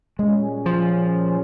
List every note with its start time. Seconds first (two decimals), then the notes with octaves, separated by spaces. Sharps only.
0.19 A#2 G3 G#3 C#4 G#4
0.66 F3